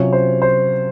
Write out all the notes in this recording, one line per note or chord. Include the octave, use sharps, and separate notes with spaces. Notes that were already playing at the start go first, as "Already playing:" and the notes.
Already playing: C3 F#3 C#4 F4 C#5
C5
C5